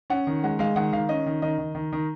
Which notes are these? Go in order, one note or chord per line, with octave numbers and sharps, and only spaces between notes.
C#4 F#5
D#3
G#3 F#5
G#3 F5
D#3 F#5
D#3 F5
C#4 D#5
D#3
D#3 D#5
D#3
D#3
D#3